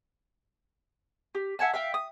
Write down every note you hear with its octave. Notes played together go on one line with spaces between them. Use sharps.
G4
E5 F#5 G#5 A5
E5 F5 G5
D#6